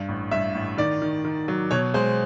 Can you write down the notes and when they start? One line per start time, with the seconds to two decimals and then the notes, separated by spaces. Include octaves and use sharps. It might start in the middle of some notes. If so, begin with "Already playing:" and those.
Already playing: G2
0.09 A1
0.31 G2 E5
0.55 A1
0.78 D#3 D5
1.02 D#3
1.25 D#3
1.48 F#3
1.71 B2 C#5
1.94 G#3 C5